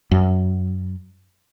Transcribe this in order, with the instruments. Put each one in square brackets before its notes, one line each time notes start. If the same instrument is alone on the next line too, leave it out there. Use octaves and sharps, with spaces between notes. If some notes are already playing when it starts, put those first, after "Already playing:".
[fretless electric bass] F#2